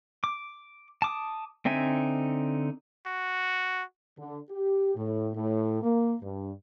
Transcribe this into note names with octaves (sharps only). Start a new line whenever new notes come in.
D6
A5 D6 D#6
D3 C4 D#4 E5 G#5
F#4
D3
G4
A2
A2
A#3
G2